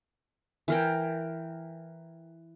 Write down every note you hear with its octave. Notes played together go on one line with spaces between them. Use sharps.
E3 A#4 G5